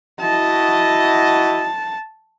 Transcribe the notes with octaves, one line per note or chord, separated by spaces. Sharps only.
E4 F#4 D#5 A5